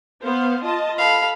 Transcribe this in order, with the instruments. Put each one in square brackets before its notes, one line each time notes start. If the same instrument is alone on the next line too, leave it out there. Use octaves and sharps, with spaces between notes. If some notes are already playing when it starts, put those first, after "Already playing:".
[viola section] B3 C5 F5
F4 D#5 A5
[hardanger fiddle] A4 F5 [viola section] B5